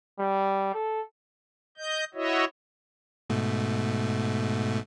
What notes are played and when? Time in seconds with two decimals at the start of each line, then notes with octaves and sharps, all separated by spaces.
0.19 G3
0.74 A4
1.77 D#5 G6
2.14 E4 F#4 C#5 D#5 E5
3.30 G#2 B2 A3